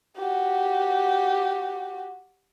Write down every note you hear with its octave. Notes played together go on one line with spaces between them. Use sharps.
F#4 G4